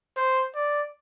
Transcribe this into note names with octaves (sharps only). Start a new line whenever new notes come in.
C5
D5